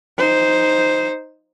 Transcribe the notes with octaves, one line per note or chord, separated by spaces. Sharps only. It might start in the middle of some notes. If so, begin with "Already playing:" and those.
D#4 C5